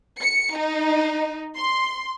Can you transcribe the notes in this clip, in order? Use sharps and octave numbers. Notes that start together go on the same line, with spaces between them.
C#7
D#4
C6